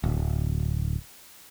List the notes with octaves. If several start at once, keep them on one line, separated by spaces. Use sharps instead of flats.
D1